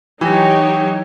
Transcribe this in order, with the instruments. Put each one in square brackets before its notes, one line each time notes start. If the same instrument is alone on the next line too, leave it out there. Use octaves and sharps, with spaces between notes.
[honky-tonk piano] E3 [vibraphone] F#3 G5 [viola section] D#4 G4 C#5